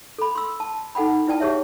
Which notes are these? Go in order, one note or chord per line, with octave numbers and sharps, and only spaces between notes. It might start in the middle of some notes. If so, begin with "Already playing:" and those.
A4 B5
C6 E6
A5
D#4 A4 F#5 G5 B5
E4 B4 D5 G5 A5
G4 G#4 C#5 E5